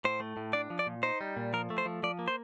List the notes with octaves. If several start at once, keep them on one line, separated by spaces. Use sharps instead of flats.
A2 C5
A3
A2
D4 D5
F3
D5
A#2
D#4 C5
G3
A#2
F3 A#4
A3
C5
F3
F3 D5
A#3
C5